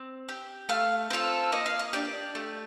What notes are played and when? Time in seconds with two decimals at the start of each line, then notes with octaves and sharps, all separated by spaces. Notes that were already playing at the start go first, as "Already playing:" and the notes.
Already playing: C4
0.29 G4
0.69 A3 F5
1.10 C4 F4 A4
1.52 A#3 D#5
1.66 F5
1.79 D#5
1.93 D4 G4 D5
2.35 A3